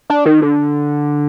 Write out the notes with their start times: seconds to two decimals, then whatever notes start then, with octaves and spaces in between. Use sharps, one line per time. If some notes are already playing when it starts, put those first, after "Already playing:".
0.10 D4
0.26 D#3
0.42 D3